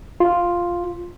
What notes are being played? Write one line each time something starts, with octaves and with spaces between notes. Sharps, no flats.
F4